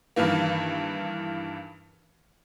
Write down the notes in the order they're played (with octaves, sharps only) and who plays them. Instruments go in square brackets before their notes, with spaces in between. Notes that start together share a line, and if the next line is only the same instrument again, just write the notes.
[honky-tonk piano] G2 D#3 E3 A#3